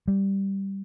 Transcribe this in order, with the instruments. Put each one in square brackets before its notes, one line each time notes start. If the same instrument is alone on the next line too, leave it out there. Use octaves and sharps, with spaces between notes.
[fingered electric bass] G3